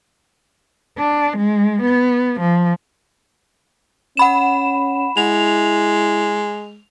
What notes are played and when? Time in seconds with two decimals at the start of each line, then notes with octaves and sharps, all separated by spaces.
0.98 D4
1.37 G#3
1.82 B3
2.40 F3
4.17 C#4 F#5 B5 E7
5.17 G#3 E4 F7